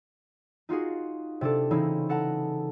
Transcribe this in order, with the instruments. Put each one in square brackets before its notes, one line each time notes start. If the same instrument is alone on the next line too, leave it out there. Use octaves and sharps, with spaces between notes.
[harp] D#4 F4 F#4 G#4
C3 D4 A4
C#3 E3 C4 C#4 D#4 E4
A4 F#5 A5 A#5